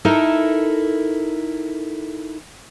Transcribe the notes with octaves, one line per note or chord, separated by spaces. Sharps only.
D#4 E4 A4 A#4